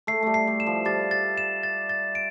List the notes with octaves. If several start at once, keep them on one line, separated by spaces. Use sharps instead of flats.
A3 C7
G3 A3
C7
G3
E7
F3
G3 A6
A6
E7
A6
A6
D7